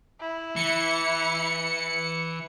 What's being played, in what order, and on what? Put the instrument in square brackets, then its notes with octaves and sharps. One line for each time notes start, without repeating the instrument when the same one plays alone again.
[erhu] E4
[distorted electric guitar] E3 [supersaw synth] C#7